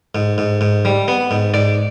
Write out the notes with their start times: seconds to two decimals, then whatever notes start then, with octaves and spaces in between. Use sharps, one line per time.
0.15 G#2
0.38 G#2
0.61 G#2
0.85 G3
1.08 B3
1.31 G#2
1.54 G#2 D5